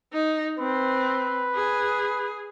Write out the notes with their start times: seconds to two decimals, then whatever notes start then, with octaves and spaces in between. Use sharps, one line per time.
0.13 D#4
0.59 C4 B4
1.55 G#4